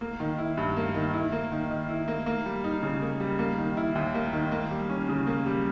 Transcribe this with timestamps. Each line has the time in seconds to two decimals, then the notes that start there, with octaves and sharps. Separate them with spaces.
0.01 A#3
0.20 D#3
0.38 E4
0.57 G2
0.77 A#3
0.95 D#3
1.13 E4
1.32 A#3
1.52 D#3
1.70 D#3
1.89 E4
2.08 A#3
2.26 A#3
2.45 G3
2.64 D#4
2.83 C#3
3.01 A#3
3.20 G3
3.39 A#3
3.58 D#3
3.77 E4
3.95 D#2
4.15 A#3
4.33 D#3
4.51 A#3
4.71 G3
4.90 C#4
5.09 C#3
5.27 A#3
5.46 G3